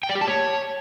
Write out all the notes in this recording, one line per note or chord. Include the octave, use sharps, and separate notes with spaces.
G5
D5
G4
A5
C#5